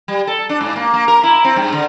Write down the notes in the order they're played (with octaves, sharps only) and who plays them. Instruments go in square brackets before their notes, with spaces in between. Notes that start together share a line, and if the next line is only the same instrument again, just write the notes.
[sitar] G3
A4
D4
G#2
A#3
A#3
A#4
E4
C4
G2
D3